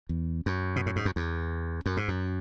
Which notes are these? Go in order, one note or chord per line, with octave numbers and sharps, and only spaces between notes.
E2
F#2
B2
A2
G#2
F#2
E2
F#2
G#2
F#2